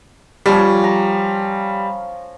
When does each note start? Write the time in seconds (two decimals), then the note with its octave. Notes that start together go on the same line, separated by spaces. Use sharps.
0.46 F3 G3 C#4
0.84 A#5